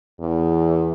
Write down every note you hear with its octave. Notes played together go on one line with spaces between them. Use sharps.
E2